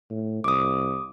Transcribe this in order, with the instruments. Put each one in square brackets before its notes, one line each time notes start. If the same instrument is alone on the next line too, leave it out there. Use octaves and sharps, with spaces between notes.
[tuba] A2
[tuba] C2 [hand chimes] D6 D#6